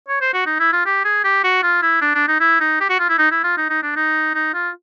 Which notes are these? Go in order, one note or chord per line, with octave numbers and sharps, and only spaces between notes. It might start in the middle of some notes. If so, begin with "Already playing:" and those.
C#5
C5
F#4
D#4
E4
F4
G4
G#4
G4
F#4
F4
E4
D4
D4
D#4
E4
D#4
G4
F#4
F4
E4
D#4
E4
F4
D#4
D#4
D4
D#4
D#4
F4